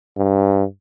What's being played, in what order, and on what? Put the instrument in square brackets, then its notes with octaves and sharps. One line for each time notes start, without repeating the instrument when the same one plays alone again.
[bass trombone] G2